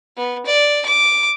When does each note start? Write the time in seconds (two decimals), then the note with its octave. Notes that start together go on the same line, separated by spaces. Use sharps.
0.17 B3
0.46 D5
0.85 D6